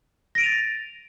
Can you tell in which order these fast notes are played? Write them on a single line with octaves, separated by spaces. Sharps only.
A#6 D7 D#7 F7 A6